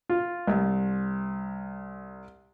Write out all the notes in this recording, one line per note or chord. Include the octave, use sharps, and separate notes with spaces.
F4
C2